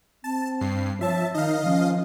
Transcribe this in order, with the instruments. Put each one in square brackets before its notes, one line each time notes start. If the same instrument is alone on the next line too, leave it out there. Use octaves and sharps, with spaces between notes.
[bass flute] C4 [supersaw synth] A5
[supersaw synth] G2 C7
[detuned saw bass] F3 [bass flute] C#5 [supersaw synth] E5 A5
[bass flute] D#3 [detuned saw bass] D#4 [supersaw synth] D#5 F5
[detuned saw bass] F3 [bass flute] C#4